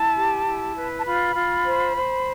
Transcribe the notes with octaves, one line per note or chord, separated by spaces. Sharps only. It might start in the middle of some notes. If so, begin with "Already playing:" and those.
Already playing: E4 A5
G4
E4
B4
A5
F4 B5
F4
C5
C5